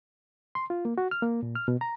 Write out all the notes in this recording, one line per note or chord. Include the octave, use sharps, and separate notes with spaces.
C6
F4
A#3
F#4
F6
A#3
A#2
F6
B2
A#5